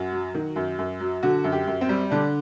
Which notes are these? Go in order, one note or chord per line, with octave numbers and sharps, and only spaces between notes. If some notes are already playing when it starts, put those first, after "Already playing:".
Already playing: F#2 F#4
F#3
D#3
F#2
F#2
F#3
D3 F#4
F#2
G4
F#2
C4
G3
D3 D4